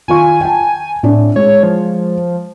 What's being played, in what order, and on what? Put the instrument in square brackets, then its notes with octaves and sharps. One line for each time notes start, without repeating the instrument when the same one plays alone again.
[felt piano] D#3 F4 C#6 [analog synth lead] G#5
[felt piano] G5 A5
[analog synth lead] A2 [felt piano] C4 D4
[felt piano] G#3 [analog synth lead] C#5
[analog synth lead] F3